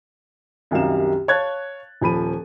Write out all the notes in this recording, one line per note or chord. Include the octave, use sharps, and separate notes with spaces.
C2 F#2 D#3 G3 F5 E7
C#5 F5 A5 F#6 G#6 A6
D#1 F3 B5 D#7